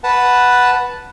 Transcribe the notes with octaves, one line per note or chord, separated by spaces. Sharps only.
B4 F#5 A5